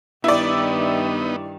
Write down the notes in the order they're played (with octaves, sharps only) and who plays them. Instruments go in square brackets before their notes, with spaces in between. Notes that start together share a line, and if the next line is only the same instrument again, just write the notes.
[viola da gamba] G2 D#3 [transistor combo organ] B3 D#4 [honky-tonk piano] E4 D5